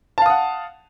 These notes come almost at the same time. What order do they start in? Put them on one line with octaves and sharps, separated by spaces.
A5 F5 D#6 F#5